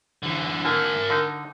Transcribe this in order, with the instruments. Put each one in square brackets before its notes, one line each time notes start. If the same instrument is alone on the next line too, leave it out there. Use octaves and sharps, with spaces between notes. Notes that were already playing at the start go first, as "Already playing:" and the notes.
[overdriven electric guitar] D3 E3
[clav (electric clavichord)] D3 A#3 [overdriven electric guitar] A#4 G#5
[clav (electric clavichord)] D3 D#4